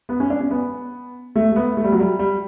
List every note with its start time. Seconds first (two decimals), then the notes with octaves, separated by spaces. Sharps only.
0.09 B3
0.20 C#4
0.30 D4
0.40 C#4
0.51 B3
1.36 A3
1.52 A3
1.56 B3
1.77 A3
1.84 G3
1.92 F#3
1.99 G3
2.19 G3